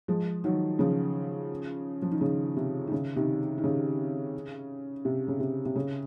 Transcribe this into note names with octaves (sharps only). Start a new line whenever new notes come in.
F3 G#3
D#3 F#3
C#3 F3
F3
D#3
C#3
C3
D#3
C#3
C3 D#3
D#3
C#3
C3
C#3
C3
C3
C#3